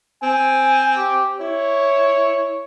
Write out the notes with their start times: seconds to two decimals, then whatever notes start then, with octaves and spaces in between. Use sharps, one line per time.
0.23 C4 G#5
0.97 G4
1.41 E4 C#5